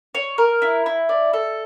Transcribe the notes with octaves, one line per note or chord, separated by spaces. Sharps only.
C#5
A#4
E4
E4
D5
A4